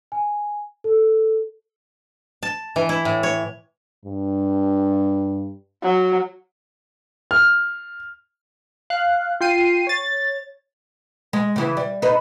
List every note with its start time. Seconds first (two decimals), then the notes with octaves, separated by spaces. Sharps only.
0.12 G#5
0.84 A4
2.43 A5
2.76 E3
2.89 E4
3.05 A2
3.23 C#5
4.05 G2
5.83 F#3
7.31 F6
8.90 F5 F#6
9.41 F4 G5 C7 D#7
9.87 C#5 A6
11.33 G#3
11.56 C#3 E3
11.77 G3
12.02 D#4 B4